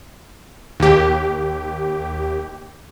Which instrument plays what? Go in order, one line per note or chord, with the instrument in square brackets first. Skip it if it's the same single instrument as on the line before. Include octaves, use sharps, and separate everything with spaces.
[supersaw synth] D#2 G4